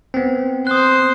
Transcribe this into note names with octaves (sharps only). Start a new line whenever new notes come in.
B3 C4
C5 D#6 F#6